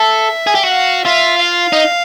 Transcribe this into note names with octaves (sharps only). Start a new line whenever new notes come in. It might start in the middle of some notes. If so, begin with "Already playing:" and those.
Already playing: A4 E5
G#4
G4
F#4
F5
F4 E5
F5
D#4